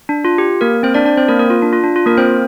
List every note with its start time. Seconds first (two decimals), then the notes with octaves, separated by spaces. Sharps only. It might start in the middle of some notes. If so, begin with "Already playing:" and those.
0.09 D4
0.25 F4
0.38 G4
0.61 A#3 A#4
0.83 C4 C5
0.94 D4 D5
1.05 D4 D5
1.17 C4 C5
1.28 A#3 A#4
1.39 A#3 A#4
1.50 F4
1.62 D4
1.73 F4
1.84 D4
1.96 F4
2.06 A#3 A#4
2.17 C4 C5